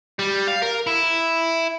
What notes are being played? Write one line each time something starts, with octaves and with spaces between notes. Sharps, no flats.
G3
F5
A#4
E4